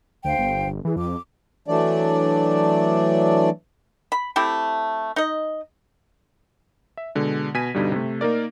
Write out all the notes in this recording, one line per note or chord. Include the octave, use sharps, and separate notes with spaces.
D2 C5 F5 G5
G1
G1
E3 G#4
F2 D6
E3 F#3 A3 D4 D5
B5
A3 C4 E4 G4
D#4 D#5
E5
B2 D3 G#3
B2 G#5 G#6 B6 D#7
G2 B2 D3 G3 D#4
C3 A3
A#3 D#4 A#4 D5